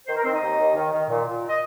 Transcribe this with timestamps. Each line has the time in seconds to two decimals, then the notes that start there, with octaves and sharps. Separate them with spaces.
0.07 D#3 C5
0.16 A#4
0.24 D#3 C4 C5
0.33 D#4 D#5
0.41 D#2
0.58 D#2
0.75 D#3
0.92 D#3
1.09 A#2
1.26 A#2
1.49 D#5